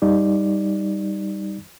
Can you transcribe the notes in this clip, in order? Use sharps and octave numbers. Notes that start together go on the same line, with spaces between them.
G3 D#4 D5